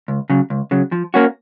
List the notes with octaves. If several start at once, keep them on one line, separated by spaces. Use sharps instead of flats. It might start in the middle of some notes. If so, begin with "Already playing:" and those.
C#2
C#3 F#3
C#2
C#3 F#3
F3
A#3 C#4 F#4